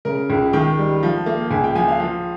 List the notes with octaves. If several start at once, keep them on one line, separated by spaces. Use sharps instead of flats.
C#3 A#4
C#2
D#3 G5
G3
F3
A#3
C#2 G#5
G5
F3 G#5
F5
F3